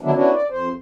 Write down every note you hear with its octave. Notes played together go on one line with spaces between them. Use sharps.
D3 D#3 F#3 B3 D4 E4
B3 C#4 D4 E4 F#4
D5
F2 C5